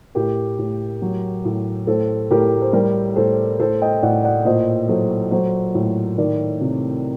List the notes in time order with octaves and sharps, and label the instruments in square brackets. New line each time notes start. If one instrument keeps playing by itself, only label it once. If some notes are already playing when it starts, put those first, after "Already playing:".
[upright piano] A2 G4 A#4
A2
F#3
A2
A2 A4 C5
A2 G4 A#4
C5
G3 G4 A#4
A2 A4 C5
A2 A4 C5
D#5 G5
A2 D5 F#5
D5 F#5
A#2 C5 D#5
F#3 A4 C5
F#3 A4 C5
A2
D#3 A#4 D5
C3